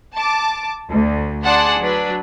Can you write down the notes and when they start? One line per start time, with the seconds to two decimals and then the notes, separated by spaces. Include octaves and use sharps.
0.16 A5 D6
0.89 D2
1.45 D4 G#4 D5 F#5 A5 C6
1.81 F#3 D4 B4